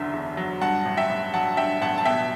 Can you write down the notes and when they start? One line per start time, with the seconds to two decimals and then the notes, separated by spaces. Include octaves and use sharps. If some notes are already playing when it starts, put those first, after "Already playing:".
Already playing: F#1 E2 D3 F#3 E5
0.14 E2
0.37 F#3
0.61 G2 F#5 A5
0.85 A1
0.97 E5 G5
1.09 A1
1.33 F#3 F#5 A5
1.57 G2 E5 G5
1.81 A1 F#5 A5
1.98 A5
2.05 B2 E5 G5